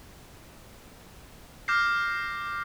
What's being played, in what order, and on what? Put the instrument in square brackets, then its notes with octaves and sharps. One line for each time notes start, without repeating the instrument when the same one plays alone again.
[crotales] D6 F6 G6 A#6 C7